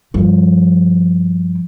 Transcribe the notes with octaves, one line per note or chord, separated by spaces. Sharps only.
G2 F3